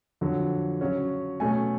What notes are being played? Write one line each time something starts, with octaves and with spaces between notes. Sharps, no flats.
F2 D3 F#3
C#3 F#3 C#4
B2 F#3 A3 C#4 G#5